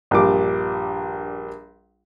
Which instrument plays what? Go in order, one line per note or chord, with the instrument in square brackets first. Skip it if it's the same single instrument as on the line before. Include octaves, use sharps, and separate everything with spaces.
[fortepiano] A#1 G2 G3 D6